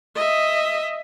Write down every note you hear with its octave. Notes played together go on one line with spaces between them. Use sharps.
D#5 E5